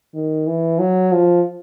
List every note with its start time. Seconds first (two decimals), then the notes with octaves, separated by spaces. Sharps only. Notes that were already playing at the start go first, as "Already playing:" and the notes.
0.14 D#3
0.47 E3
0.79 F#3
1.12 F3